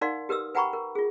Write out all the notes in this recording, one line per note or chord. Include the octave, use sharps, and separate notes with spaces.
D#4 A#4 D5 F5 F#5 C6
G4 A#4 B4 D#6 E6
B4 F#5 G5 A#5 B5 C#6
A#4
F4 G#4